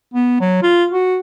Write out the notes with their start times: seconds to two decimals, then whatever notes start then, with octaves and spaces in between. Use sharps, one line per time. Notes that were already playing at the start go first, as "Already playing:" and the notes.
0.14 B3
0.40 F#3
0.63 F4
0.91 F#4